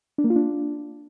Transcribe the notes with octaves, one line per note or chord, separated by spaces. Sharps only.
D4
A#3
F4
D4